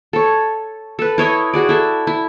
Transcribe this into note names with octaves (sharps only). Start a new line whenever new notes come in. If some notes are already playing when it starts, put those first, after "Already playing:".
A4 C#5
A4 B4
E4 C#5 D#5
F#4 G#4 D5
E4 A4
E4